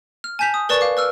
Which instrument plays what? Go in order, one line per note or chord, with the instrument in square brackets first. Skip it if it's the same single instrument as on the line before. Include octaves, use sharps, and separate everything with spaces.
[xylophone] F6
G#5 A5 G6 B6 F7
D#6
A#4 B4 D5 A5 C#6 A6
F5 D6
B4 E6 F6